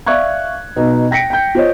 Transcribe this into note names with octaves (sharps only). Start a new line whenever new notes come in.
D5 E5 F5 C#6 F#6 G#6
B2 D#4
G5 A#6 B6 C#7 D7
G5 G6
F4 C5 C#5 D#5